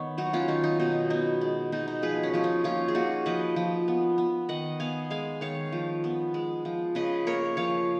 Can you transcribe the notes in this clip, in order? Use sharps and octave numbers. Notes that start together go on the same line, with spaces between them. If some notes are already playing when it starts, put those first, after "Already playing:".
Already playing: D#3 B3 C#5
F#3 D#4 F#4
C#4 F4
D#3 D#4
D#4
B2 D#4
B3 D#4
G#3
B2 D#4
D#4
F3 G#4 B4
C#4
F3 C#4
D#4
A#3 C#4 F4
G#4
A#3 D#4 F#4
F3 B4 D#5
F3
B3
B3
D#3 D#5 F#5
B3 F5 G#5
G#3 F5 G#5
D#3 C#5 F5
F3
B3
G#3
F3
C#3 B4 D#5
A#3 A#4 C#5
F3 C#5 F5